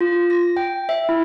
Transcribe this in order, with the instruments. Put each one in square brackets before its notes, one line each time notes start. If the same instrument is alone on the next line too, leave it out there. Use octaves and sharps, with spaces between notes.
[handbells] F4
A#6
G5
E5
E4